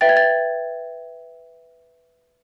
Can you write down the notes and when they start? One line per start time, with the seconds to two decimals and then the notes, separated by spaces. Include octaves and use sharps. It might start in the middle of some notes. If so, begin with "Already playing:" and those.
0.01 B4 E5 G5 A6
0.09 G#6
0.17 A6